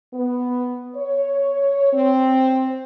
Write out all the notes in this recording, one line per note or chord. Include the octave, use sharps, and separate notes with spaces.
B3
C#5
C4